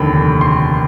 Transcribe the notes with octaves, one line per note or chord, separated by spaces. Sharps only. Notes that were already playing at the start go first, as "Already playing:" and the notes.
Already playing: F1 D#2 D3 B5
C6